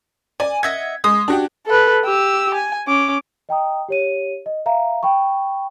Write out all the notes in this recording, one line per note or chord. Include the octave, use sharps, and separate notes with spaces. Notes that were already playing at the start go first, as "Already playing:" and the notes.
D5 G#5
D#5 E5 F#5 G#6
G#3 D#6
D4 F#4 G4
A4 B4
G4 E6
G#5
C#4 D6
D#5 G5 A#5 D#6
G4 C#5 D#7
D#5
E5 F5 A#5
G5 B5 C#6